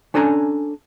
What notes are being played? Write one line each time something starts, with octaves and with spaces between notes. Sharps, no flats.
C#4 D4 A4 G#5 A#5